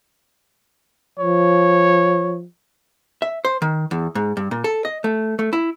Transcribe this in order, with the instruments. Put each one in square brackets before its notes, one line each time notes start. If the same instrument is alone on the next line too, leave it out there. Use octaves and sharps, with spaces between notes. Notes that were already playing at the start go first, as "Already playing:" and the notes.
[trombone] F3 [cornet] C#5
[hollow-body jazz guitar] E5
C5
D#3
E2
G#2
G2
A#2
A4
D#5
A3
A3
E4